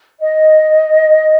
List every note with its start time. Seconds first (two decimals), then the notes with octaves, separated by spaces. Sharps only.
0.21 D#5